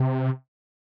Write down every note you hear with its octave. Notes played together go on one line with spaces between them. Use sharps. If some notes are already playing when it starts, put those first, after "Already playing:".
Already playing: C3